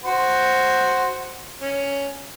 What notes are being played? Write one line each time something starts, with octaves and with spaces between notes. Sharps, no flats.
F#4 C5
C#4